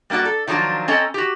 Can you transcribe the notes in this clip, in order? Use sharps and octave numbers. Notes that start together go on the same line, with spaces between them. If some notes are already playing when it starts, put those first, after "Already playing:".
G3 A#3 F4 F#4 D5
A4
D#3 F3 F#3 D4 F4
C4 C#4 A4 D#5 A#5
F#4 G4